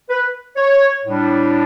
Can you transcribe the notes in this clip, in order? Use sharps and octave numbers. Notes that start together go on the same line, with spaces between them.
B4
C#5
A2 G3 D4